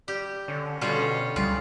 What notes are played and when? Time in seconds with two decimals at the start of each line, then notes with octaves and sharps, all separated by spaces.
0.08 G3 G4
0.48 D3 C#4
0.81 B2 D3 G3 C#4 F4
1.36 C#2 C#3 G3 F4